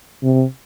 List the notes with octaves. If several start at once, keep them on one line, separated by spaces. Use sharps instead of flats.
C3